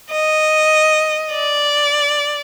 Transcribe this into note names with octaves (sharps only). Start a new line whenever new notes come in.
D#5
D5